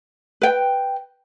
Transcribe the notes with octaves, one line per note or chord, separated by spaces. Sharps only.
B4 G5